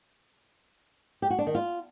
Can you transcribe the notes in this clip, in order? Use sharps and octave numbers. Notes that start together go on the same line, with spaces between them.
G4
F#4
D4
D#3
F4